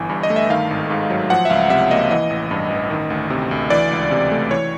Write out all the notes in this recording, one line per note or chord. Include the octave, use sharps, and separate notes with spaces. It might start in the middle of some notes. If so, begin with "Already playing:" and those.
Already playing: G1 E3 G#5
G2
D#5
A3
E5
D#3 F5
G#1
G#2
F#3
F3 F#5
E5
C#2 F5
C3 E5
A#3 D#5
E3 D#5
A1
G2
A1
D#3
D2
C3
D2
E3 D5
C#2
C3
A3
E3 C#5